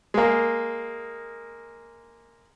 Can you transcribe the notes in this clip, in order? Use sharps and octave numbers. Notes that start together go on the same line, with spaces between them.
G#3 A#3